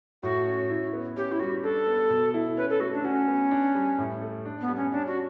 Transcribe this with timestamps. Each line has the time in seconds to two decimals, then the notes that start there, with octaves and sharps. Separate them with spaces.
0.23 A2 F#4
0.46 C#4
0.70 E4
0.93 B3
1.16 C#4 G4
1.32 E4
1.40 G3 F#4
1.63 D4 A4
1.87 B3
2.10 B2
2.34 E4
2.57 C#4 B4
2.69 A4
2.80 A3 F#4
2.93 D4
3.04 C#4 F#4
3.28 B3
3.51 D4
3.75 G3
3.98 A2
4.22 A3
4.45 D4
4.61 B3
4.69 G3
4.76 C#4
4.92 C#4 D4
5.07 F#4